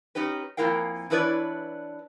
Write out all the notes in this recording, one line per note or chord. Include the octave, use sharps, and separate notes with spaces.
C#4 D#4 G4 B4
F2 A#2 E4 A#4 F5 G5
E3 D4 E4 B4 C#5 D5